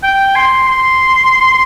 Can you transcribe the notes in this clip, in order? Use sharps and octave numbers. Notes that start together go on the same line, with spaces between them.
G5
C6
C6